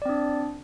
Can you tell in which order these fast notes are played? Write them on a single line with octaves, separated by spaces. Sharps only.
D5 C4 D4